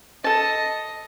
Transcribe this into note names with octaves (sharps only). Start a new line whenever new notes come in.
A4 D#5 A5